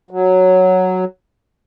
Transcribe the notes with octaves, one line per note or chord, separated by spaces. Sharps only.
F#3